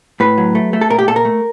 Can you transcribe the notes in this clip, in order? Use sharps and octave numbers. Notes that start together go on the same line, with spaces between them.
A2 B4
F#3
A3
A3
A4
A#2 A#4
G4
A#2 A4
A#4
A3